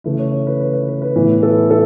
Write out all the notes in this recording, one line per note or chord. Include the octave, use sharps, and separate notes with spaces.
C#3 E3 A3 B4
C#5
C#5
B4
B4
B4
B4
B4
A2 E3 B3 B4
A4
A4